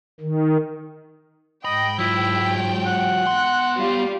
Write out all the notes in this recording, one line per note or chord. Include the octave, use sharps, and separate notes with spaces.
D#3
G#2 D#5 G5 B5
F#3 E4 F4
F#5
B3 C6
G3 F4